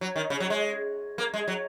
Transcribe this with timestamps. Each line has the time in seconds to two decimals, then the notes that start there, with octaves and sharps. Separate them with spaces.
0.01 F#3
0.16 D#3
0.30 C#3
0.40 F#3
0.50 G#3
1.18 A#3
1.34 G#3
1.48 F#3